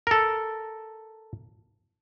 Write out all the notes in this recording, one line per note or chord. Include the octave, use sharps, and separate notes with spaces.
A4 A#4